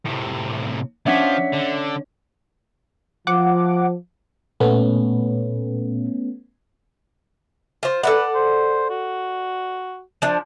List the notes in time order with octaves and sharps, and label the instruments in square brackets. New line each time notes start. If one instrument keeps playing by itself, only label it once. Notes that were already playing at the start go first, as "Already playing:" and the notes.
[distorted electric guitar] A2 C3
[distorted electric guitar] F3 [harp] C#4 D4 [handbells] E5 F#5 B6
[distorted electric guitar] D3
[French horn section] F3 [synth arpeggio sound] F#5 D6
[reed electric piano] A#2 [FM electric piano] A3 B3 C#4
[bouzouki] F4 C5
[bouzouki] A4 D5 F#5 [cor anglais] B4
[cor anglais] C5
F#4
[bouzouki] F3 D4